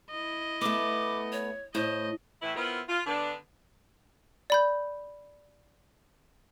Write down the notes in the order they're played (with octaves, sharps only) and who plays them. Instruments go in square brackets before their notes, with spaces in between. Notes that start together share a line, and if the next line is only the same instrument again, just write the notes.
[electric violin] E4 D#5
[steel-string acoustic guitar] A3 B3 [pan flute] D6
[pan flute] C#5
[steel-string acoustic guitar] A2 [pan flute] C5 [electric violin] D#5
[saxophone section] A2 E3 E4
B3 C4 E4 F4 A#4
F4
D3 B3 D4
[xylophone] D5 B5 G6